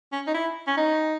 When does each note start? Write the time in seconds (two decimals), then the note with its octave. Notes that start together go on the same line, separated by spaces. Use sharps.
0.12 C#4
0.27 D#4
0.34 E4
0.67 C#4
0.77 D#4